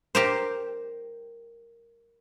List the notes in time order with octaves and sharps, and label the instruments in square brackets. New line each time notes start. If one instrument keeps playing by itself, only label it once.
[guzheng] G4 A#4 C5